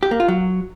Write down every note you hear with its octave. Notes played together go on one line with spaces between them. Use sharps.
G4
A#3
F4
F#3